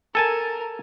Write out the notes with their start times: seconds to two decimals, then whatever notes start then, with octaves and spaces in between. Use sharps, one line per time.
0.15 A4 A#4 G#5 A5